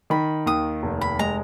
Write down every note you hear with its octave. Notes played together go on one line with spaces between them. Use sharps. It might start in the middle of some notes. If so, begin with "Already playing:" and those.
D#3 B5
D#2 D#6
F1
B5
G#3 A#5